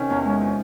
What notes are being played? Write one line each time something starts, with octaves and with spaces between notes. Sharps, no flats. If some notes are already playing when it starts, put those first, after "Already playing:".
Already playing: C3 D#3 C#4
E2
G#3
F3